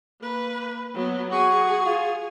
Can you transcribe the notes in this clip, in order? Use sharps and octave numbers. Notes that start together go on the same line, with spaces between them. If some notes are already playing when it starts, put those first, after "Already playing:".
A#3 B4
F#3 B3
F#4 G#4 G#5
F4